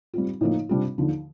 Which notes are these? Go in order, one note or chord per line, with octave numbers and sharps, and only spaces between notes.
G3 C4 F4
A2 F3 A#3 D#4
C3 G3 D4 F4
D#2 D3 F3